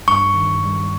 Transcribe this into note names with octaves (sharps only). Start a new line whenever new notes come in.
G2 C#6
D#3
G3